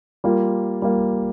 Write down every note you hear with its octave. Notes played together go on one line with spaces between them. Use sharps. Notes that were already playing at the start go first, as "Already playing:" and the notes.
G3 A#3 F4
G3 A#3 F4